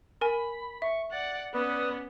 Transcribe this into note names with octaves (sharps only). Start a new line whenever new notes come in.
A#4 G#5 B5
E5 C#6
D5 F#5 A6
B3 C#4 B4 D5 D#6